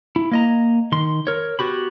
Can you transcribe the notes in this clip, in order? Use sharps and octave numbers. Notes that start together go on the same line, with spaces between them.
E4
A#3 D#5 A#5
D#3 C6
A#4 C#5
B3 F#4 G4 B5